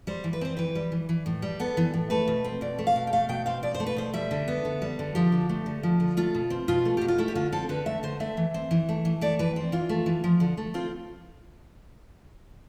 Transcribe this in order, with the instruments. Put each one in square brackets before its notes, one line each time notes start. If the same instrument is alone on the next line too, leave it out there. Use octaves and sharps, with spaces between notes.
[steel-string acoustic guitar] G3 C5
E3
B4
C4 C5
E3 B4
G3
E3
E3
A2
G3
B3 A4
E3
A2
A3 B4
B2
C4
B2 D5
A3
F5
B2
G5
A3 F5
B2 G5
C4 F5
B2 D5
C5
A3
B4
B2 C5
G3 E5
D3
B3
D3
G3
D3
F3 G4
D3
A3
D3
F3
D3
A3 F4
B2
C4
B2 F4
A3
B2 G4
F4
A3 E4
G4
D3 F4
C4 A4
D3 B4
A3 E5
D3 C5
A3 E5
E3
C4
E3
A3
E3
A3 D5
E3 B4
C4
E3 F4
A3
E3
F3
D3
A3
C4 F4